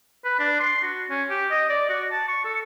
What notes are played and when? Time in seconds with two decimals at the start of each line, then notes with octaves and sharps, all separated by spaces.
0.24 B4
0.39 D4
0.59 C6
0.83 F#4
1.10 C#4
1.30 G4
1.50 D#5
1.69 D5
1.90 F#4
2.11 A5
2.28 C#6
2.45 A4